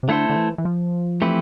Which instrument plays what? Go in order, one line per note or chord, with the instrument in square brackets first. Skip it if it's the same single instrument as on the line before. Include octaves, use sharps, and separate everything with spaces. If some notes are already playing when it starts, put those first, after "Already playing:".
[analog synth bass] C3
[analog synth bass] D3 [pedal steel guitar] A3 E4 A4 C5
[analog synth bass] D3
E3
E3
F3
[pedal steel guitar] E3 A3 C4 G4 B4